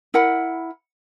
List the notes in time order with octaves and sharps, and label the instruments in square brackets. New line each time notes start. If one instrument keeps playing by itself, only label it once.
[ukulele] E4 A#4 F#5 B5